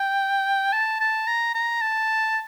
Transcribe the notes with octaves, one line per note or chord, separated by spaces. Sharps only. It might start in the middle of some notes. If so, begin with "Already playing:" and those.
Already playing: G5
A5
A5
A#5
A#5
A5